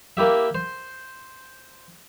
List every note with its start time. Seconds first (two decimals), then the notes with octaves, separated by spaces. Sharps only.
0.17 A#3 E4 G4 E5
0.55 C5